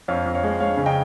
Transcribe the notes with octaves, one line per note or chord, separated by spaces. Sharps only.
F2 C#5 F5
F2
C#5 F5
G#3
G#3 C#5 F5
C#3
D#5 G5